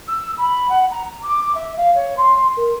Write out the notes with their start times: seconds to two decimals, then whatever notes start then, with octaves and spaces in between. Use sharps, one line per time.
0.08 E6
0.38 B5
0.69 F#5
0.91 A#5
1.22 D6
1.55 E5
1.77 F5
1.95 C#5
2.17 C6
2.57 A#4